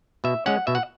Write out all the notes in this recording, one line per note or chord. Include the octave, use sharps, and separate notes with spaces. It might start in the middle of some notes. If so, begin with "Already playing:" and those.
B2 E5
G#3 C#4 F#5
B2 E5
F#5